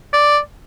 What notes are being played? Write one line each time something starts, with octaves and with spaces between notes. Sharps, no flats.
D5